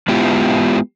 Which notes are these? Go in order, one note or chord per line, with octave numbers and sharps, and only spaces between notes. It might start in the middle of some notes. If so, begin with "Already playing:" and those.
G#3 B3 E4 F4 G4